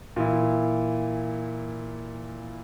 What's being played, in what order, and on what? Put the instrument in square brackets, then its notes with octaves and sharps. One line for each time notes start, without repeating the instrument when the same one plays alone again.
[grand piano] A#2 E3 E4